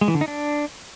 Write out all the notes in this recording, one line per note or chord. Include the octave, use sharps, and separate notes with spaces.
G#3
E3
D3
D#4
D4